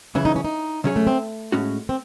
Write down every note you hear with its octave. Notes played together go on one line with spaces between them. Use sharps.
F#2 C#3 E3 E4
D#4
C#4
D#4
C3 F#3 C#4 G#4 C#5
A3
C4
A2 G#3 C#4 F#4
C4